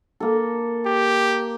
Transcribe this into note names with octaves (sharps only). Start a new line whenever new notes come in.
A#3 A4
G4